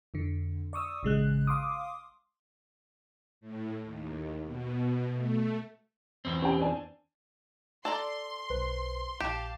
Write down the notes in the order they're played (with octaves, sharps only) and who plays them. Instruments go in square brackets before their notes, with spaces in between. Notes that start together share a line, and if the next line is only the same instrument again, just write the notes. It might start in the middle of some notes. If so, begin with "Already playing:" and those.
[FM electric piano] F2 D3
D5 C#6 D#6 E6
A1 C#3 G#3 F#6
F5 C6 D6 D#6
[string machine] A2
D#2
B2
A3
[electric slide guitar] E2 C4
[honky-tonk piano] C#4 G4 G5
D4 G#5 A5
[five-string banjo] A4 D5 A#5 [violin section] C6
[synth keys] B1 B4 C5
[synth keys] A#1 E7 [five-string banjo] G4 [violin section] F5 A5